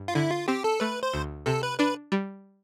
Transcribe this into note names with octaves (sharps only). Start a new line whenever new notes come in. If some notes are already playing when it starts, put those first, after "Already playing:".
Already playing: G2
F4
D3 E4
F4
C4 G4
A4
A3 B4
C5
D2
C3 A4
B4
D4 B4
G3